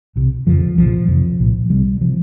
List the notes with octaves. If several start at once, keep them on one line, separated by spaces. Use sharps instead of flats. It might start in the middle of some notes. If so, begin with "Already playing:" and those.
C2 C3
F2 C#3 F3
C2 A#2 F3
F2 C3 F3
C2 A#2
C2 C3 G3
C3 F3